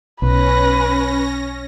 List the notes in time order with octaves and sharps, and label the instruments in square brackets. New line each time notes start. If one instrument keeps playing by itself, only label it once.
[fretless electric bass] B1 [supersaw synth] C#4 A#6 [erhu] B4